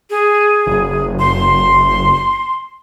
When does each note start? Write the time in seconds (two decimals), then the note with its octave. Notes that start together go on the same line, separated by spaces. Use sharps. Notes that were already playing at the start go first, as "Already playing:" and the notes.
0.10 G#4
0.67 F#1
1.19 C6